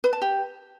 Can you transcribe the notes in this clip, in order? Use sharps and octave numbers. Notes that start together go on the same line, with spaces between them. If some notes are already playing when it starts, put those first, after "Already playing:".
B4
A5
G4